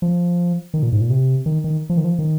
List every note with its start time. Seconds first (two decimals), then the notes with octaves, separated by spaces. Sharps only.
0.02 F3
0.74 D#3
0.83 A#2
0.92 G#2
1.01 A#2
1.10 C3
1.46 D#3
1.64 D#3
1.90 F3
1.97 D#3
2.04 F3
2.19 D#3